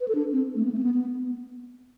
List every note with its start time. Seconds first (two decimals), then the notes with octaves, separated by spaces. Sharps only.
0.01 B4
0.08 A4
0.15 D4
0.32 C4
0.55 A3
0.65 B3
0.72 A3
0.78 C4
0.83 B3
0.94 B3